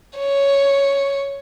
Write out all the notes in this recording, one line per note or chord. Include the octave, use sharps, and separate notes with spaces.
C#5